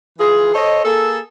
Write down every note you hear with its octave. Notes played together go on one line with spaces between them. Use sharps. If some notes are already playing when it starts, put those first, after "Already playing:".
E3 F4 G#4
A4 C5 C#5 D#5
A#3 G#4 A4